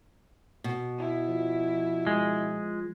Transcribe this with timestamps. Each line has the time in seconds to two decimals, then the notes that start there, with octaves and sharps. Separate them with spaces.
0.64 B2
0.98 E4
1.28 F3
2.07 G#3